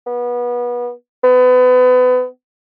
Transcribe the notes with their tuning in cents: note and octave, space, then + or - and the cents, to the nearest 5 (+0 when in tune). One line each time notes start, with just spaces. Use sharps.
B3 -25
B3 +30